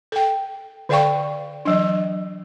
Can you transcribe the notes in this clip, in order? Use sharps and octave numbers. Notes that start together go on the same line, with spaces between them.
A4 G5
D3 A4 D5 F5 G5 C#6
E3 F#3 D4